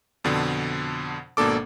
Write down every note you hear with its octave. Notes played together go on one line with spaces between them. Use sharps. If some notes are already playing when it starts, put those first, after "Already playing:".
F2 B2 D3
G#1 B2 A#3 D4 A4 D6